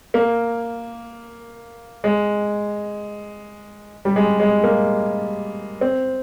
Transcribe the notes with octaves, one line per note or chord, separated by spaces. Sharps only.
A#3
G#3
G3
G#3
G#3
A#3
C4